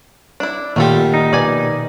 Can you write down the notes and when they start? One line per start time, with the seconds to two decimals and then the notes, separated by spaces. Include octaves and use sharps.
0.40 D4 E4
0.76 A#1 A#2 D#3 G3 A3 F4 A4 F#5
1.14 D#4
1.33 B2 B4 D5 G#5